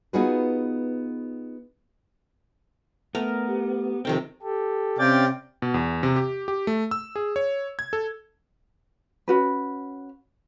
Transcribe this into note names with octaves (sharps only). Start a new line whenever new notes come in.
B3 D#4 F4 F#4 G#4 B4
A3 B3 A#4
G4
C3 D#3 F3 C4 A4 G5
G4 A4
C3 C#4 D5 F5 G5 A6
B2
E2
C3
G4
G4
A3
E6
G#4
C#5
G#6
A4
C#4 F#4 B4